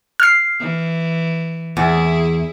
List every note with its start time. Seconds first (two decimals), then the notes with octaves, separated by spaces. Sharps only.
0.20 F6 C7
0.59 E3
1.77 E2 E4 G#4